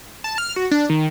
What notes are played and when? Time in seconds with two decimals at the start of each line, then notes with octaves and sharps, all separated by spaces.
0.24 A5
0.38 F6
0.56 F#4
0.71 D4
0.89 D#3